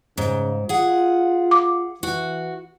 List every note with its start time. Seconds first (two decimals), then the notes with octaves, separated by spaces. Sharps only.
0.17 G#2 C#3
0.69 F4 G#4 F#5
1.51 D6
2.03 E3 F#4